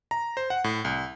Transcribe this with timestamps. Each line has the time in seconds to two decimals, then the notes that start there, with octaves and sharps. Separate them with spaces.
0.11 A#5
0.37 C5
0.50 F#5
0.64 A2
0.85 C2